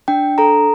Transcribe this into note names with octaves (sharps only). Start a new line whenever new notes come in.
D4 G5
A4 A#5